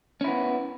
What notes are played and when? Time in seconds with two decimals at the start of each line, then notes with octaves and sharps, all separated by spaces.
0.21 C#4
0.24 E4
0.28 B3